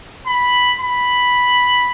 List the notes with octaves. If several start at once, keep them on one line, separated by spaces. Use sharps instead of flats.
B5
B5